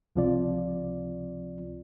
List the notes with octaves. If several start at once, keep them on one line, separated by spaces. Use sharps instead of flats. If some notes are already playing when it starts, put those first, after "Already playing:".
C#2 C3 F3 C4 F4 D5